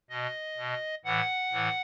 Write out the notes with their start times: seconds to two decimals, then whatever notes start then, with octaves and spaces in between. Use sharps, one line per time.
0.10 B2 D#5
0.57 B2
1.05 A2 E3 F#5
1.52 A2 E3